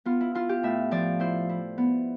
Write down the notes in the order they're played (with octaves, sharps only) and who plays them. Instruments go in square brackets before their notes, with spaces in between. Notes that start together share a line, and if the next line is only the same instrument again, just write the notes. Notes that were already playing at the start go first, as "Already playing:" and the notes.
[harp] B3 F4
E4
E4 F4
G4
A2 E5
F3 D5
E4 C5
E4
B3